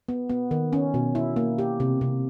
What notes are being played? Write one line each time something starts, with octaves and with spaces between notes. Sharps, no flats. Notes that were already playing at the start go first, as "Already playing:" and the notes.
B3
B3
D#3
C#4
B2
E4
A#3
G4
C3
C3